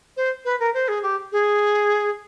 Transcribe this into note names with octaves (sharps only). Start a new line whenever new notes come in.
C5
B4
A#4
C5
G#4
G4
G#4